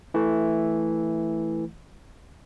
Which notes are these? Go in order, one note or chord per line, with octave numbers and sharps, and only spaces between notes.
E3 A3